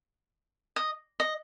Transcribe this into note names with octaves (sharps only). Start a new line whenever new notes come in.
D#5
D#5